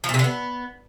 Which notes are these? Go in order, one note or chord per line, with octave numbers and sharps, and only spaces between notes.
F3
A#2
C3
D3
B3